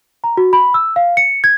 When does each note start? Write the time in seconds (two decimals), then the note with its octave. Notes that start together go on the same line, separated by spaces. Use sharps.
0.24 A#5
0.37 F#4
0.53 B5
0.74 E6
0.96 F5
1.17 C#7
1.44 G#6